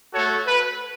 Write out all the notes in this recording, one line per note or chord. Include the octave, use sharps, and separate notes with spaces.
A3 F#4 A4 C#5
B4